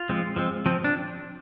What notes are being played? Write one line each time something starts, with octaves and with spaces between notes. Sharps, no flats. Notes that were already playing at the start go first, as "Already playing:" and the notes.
Already playing: F4
F3 G#3 C4
F3 G#3 C4
F3 C4
D4